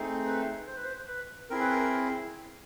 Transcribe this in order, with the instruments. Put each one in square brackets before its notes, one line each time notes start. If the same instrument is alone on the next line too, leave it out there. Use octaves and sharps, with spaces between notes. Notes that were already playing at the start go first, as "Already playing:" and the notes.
Already playing: [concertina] A3 C4 D#4 G#4
B4
C5
B4
C5
B4
C4 E4 G#4 A#4
B4
A#4